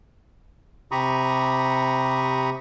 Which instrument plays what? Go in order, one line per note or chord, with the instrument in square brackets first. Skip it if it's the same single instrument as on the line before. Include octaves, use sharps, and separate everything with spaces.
[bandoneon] C3 G4 A#5 B5 C#6 D#6